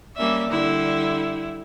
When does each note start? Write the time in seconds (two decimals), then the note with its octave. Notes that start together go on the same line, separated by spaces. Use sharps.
0.16 G3 A#3 C#4 D5 E5
0.50 D3 G3 E4